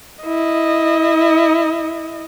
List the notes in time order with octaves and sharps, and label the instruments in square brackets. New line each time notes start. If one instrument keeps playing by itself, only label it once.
[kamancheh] E4 D#5